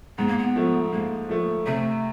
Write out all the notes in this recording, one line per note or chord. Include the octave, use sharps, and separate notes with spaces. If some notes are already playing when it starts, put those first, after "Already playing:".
G#2 B3
A#3
B3
F3 A3
G#2 A#3
F3 A3
C3 A3